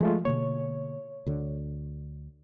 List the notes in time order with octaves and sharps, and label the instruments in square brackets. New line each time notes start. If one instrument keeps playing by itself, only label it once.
[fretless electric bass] F3 [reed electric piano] G#3 A3 F4
[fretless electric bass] B2 D3 A#3 [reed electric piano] C#5
[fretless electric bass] D2 D3